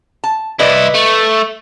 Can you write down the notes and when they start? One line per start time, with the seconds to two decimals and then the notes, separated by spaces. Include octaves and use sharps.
0.24 A5
0.59 C2 E4 B4 D5 D#5
0.94 A3